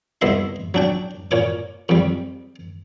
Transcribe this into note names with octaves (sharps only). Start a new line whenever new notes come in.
C2 B3 D#5 E5 C6
F#3 D4 G5
A#2 C#5 D6
F2 G3